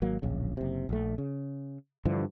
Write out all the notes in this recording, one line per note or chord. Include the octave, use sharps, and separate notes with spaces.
G#1 F#3 A#3
D1 A#1 C#3
F#1 C3
A#1 A3
C#3
G2 D3 E3 F3